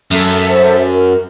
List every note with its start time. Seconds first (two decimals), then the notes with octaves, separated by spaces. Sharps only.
0.11 F#2 A4 E5
0.48 C5
0.91 A#4